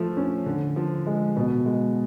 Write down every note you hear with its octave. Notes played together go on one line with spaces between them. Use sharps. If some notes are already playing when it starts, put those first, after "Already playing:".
Already playing: F3 A3
C#4
D3
F3
G#3
B2
G#3